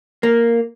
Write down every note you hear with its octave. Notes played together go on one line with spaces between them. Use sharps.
A#3